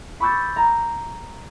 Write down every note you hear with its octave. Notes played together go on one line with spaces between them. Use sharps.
B5 C#6 D6 E6 G6 A6
A#5